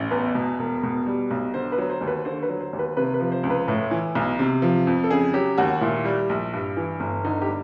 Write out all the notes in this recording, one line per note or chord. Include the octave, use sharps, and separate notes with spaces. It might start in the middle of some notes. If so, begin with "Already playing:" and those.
Already playing: A1
E2 B4
B2
E1
B2
G3
B1
D3 C5
B4
F#3
C5
D#2
B4
D3 C5
B4
F#3
C5
D#2
B4
C3 B4
B4
F3
C5
C#2
B4
A2
E3
B1
C3
F3
F2
A4
C#3 G#4
F#3 G4
D#2 F#4
A#2 E4
G3
A#1
G2
E3
G1
D3 D#4
G4
G3